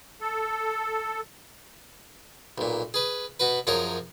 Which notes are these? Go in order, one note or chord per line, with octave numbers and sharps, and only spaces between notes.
A4
B1 A#2
G#4 B4
B2 F#4 B4
F#2 F3 G#4 A#4 C#5